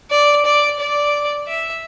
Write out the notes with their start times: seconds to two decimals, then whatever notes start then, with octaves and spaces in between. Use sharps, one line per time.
0.11 D5
0.45 D5
0.80 D5
1.48 E5